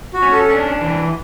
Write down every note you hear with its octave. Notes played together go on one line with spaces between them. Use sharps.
F#4
C#4
A4
D4
E3